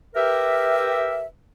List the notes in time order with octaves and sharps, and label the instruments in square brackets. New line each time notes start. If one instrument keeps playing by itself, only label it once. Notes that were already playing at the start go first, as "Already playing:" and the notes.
[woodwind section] G4 A#4 B4 E5